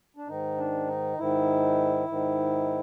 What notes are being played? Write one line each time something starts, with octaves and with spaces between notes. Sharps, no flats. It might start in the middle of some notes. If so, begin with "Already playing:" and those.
D4
G#2 D#3 D#4
D4
D#4
G#2 D#3 E4
G#2 D#3